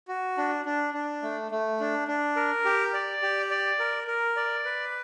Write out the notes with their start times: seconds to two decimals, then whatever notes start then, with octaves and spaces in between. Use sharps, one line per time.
0.08 F#4
0.38 D4
0.65 D4
0.94 D4
1.22 A3
1.51 A3
1.80 D4
2.08 D4
2.36 A#4
2.65 G4
2.94 D5
3.22 G4
3.51 D5
3.79 A#4
4.07 A#4
4.36 D5
4.65 B4